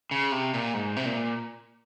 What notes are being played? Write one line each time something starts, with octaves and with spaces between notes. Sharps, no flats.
C#3
C3
A#2
G#2
C3
A#2